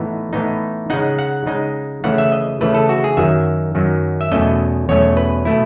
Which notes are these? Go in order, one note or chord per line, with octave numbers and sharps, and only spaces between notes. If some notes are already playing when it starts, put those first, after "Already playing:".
Already playing: A2 E3 B3 D#4
A2 E3 B3 D#4
C#3 G#3 D#4 F#5
F#5
C#3 G#3 D#4
C#3 E3 A3 F#5
E5
D#5
C#3 E3 A3 B4
A4
F#4
G#4
F#2 D#3 F#3 E5
F#2 D#3 F#3
E5
E2 B2 F#3 A3 C#4 D#5
E2 B2 F#3 A3 C#4 C#5
B4
B2 A3 E4